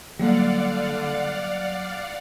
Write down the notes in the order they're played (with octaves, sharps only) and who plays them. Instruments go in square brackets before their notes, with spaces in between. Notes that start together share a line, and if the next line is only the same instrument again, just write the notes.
[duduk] D3 [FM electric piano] F#3 [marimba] G3 A#3 [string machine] D5 F5 F#5